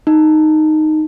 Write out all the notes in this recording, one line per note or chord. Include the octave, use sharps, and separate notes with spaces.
D#4